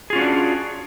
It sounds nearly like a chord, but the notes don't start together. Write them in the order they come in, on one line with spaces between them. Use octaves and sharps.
G#4 F4 C#4 F#4 D4